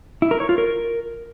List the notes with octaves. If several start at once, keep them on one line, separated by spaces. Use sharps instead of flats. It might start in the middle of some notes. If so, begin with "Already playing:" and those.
E4
A#4
C#5
F4
A#4